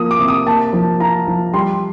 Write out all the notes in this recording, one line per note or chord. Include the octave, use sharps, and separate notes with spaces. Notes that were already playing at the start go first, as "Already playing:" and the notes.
Already playing: F3 A#3 F4 D#6
D6
C3
D#6
A#3 A5
F3
F4 A#5
F3
G3 C6